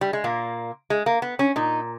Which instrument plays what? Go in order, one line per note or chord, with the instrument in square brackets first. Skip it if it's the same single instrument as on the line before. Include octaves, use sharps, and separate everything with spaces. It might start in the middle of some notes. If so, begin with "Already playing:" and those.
[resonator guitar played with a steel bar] G3
G#3
A#2 A#3
G#3
A#3
B3
C#4
A#2 D#4